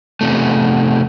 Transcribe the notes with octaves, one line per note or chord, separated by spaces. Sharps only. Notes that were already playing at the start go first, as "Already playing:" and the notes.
E2 G#2 C3 A3